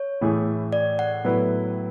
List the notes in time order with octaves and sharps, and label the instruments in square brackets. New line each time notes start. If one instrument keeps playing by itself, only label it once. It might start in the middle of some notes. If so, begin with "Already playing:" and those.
Already playing: [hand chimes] C#5
[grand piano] A2 E3 A3 E4 G#4
[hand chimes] D5
F#5
[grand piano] A2 F#3 B3 E4 B4